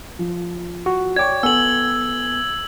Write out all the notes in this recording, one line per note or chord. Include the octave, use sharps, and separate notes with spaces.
F3
F#4
C#5 D5 G5 C#6 D6 G#6
B3 A4 G#5 E6 F#7